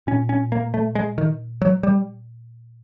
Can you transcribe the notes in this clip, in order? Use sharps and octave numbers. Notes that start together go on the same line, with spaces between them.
A#2 C#4
C#4
A#3
A3
G#3
D#3
F#3
G3